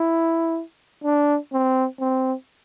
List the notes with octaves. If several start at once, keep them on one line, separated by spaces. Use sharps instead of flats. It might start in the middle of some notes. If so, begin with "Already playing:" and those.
Already playing: E4
D4
C4
C4